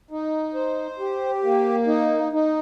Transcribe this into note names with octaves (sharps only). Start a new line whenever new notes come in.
D#4
C5
G4
A#3
D#4
D#4